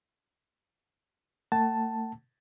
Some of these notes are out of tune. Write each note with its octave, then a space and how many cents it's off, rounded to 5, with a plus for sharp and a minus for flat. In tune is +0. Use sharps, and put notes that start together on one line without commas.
A3 +40 F#5 +40 A5 +0